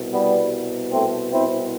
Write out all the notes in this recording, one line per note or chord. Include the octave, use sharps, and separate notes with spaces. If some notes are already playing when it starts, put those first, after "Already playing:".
Already playing: C2 B2
G3 B3
A3 C4
C4 E4